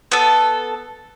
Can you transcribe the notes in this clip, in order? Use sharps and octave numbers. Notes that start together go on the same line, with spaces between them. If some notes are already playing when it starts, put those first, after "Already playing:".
B3 A4